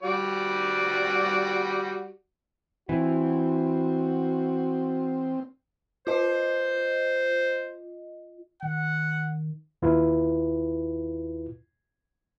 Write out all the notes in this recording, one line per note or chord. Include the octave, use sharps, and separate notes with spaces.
G3 F#4 D5
E3 C4 F#4
F4 C5 D#5
D#3 F#5
D#2 E4 F4 B4